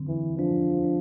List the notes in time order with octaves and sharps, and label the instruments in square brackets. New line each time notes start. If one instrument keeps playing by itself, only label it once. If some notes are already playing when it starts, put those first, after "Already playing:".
Already playing: [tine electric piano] D3 F#3 C4
[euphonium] E3
[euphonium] F3 [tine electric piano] D4
[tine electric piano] D4